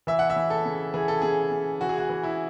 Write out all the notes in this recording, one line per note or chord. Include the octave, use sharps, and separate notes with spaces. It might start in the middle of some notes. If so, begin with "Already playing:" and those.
E3 E5
F#5
E5
E3
A4
C#3
E3 G#4
A4
C#3 G#4
C#3
E3 F#4
G#4
F#4
E3
E4